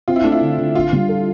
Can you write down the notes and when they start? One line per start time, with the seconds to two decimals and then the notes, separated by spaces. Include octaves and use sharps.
0.08 C4 F4
0.16 E4
0.24 A3 D4
0.32 E4
0.41 D3
0.58 D3
0.75 D4 F4
0.93 G3
1.09 A4